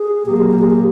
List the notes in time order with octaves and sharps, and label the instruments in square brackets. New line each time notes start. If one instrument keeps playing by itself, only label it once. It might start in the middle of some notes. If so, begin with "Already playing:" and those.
Already playing: [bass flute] G#4
[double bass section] A#2 F#3 A#3 [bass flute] G4
[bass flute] G#4
G4
G#4
G4